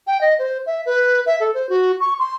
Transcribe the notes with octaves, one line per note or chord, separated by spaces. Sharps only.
G5
D#5
C5
E5
B4
E5
A4
C5
F#4
C#6
C6